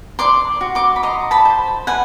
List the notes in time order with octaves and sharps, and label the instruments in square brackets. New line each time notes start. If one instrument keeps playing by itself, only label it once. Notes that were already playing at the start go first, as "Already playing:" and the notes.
[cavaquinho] D5 C6 D6
F#4
C6 D6
B5
D#5 A#5 C6
A5 B5
C5
B4 F#5 G#5